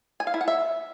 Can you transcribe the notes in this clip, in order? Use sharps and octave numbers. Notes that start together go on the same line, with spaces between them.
G#5
F5
E4
F#5
E5